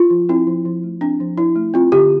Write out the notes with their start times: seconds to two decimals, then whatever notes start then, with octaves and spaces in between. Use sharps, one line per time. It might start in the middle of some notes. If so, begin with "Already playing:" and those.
Already playing: F4
0.10 F3
0.29 C4 E4
0.47 F3
0.65 F3
0.83 A3
1.01 C4 D4
1.20 F3
1.38 F3 E4
1.56 A3
1.74 C4 F4
1.92 D3 G4